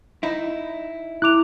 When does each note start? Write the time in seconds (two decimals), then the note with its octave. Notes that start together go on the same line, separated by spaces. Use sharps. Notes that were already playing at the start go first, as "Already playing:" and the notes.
0.23 D#4 E4
1.22 E4 D6 F#6 F7